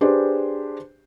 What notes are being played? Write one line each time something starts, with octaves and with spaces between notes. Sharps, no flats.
D4 G4 G#4 B4 C5